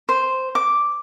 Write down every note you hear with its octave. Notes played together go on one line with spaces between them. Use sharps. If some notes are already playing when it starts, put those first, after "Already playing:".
C5
D6